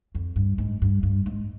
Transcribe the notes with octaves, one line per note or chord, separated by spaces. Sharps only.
F2
G2
G#2
G2
G2
G#2